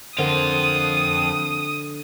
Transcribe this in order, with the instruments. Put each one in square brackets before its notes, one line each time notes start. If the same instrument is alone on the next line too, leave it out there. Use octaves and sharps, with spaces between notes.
[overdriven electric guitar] F2 F4 [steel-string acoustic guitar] D3 [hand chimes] A#4 C5 F#5 [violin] D#6